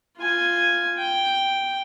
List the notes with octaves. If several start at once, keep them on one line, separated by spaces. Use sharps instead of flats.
F4 G#5
G5